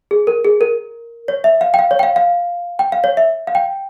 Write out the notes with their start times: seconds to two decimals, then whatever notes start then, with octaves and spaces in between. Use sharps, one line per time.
0.11 G#4
0.27 A#4
0.45 G#4
0.61 A#4
1.28 C#5
1.44 E5
1.61 F5
1.74 G5
1.79 F5
1.91 C#5
1.99 G5
2.03 F5
2.16 F5
2.79 G5
2.92 F5
3.04 C#5
3.17 E5
3.47 F5
3.55 G5